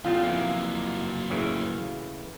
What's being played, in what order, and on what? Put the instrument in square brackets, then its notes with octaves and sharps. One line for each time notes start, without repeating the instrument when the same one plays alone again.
[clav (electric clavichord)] E2 A3 [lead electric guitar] C#4 G4 [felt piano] F4
[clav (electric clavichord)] F2 E3 [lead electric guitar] F#3 A#3
[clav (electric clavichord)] A2 C#3 E3